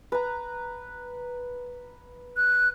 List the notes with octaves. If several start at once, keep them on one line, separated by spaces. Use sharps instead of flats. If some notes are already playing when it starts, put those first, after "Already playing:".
B4 A#5
F#6